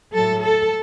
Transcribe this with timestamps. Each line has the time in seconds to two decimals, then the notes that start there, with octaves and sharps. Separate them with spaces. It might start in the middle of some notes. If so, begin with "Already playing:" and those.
0.13 A2 F#3 A4
0.43 A4